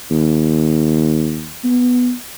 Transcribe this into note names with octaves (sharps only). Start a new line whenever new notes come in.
D#2
B3